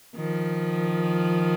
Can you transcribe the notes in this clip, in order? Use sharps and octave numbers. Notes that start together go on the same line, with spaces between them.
D#3 F3